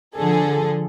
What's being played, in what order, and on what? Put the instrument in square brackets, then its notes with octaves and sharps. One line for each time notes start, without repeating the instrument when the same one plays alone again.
[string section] D3 F3 G#4 A4